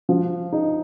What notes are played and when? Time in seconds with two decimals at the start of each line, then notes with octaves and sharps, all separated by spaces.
0.09 F3
0.52 D#4